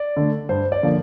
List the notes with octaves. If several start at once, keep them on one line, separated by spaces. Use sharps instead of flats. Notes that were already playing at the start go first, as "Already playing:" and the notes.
Already playing: D5
D3 A3
G2 C5
D5
D3 F3 A#3